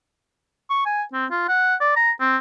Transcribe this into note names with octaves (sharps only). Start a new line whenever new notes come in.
C#6
G#5
C4
F4
F#5
D5
A#5
C4